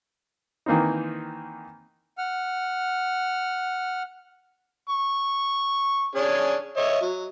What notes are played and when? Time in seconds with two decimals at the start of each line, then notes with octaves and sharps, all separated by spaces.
0.66 D#3 E3 A#3 C4 D#4
2.18 F#5 F6
4.90 C#6
6.15 C#4 D4 G#4
6.77 C#5 D#5 E5
7.01 F#3